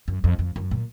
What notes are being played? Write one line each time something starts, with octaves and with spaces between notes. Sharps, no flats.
F#2
F2
F2
F#2
A#2